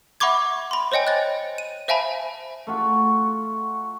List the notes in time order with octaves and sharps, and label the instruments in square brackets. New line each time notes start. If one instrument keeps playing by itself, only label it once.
[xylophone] E5 F#5 B5 C#6 D6 G#6
B5 C6
C5 C#5 D#5 G5 G#5
F#6 A6
D#7
C5 E5 F5 G#5 A5 B5
[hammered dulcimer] A3 F4 F#4